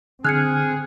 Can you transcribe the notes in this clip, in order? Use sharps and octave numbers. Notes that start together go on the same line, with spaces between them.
D3 C4 G#4 F6 F#6 G#6 C#7